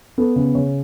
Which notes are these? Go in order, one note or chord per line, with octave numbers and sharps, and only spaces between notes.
B3 A4
C#3
C#3 C#5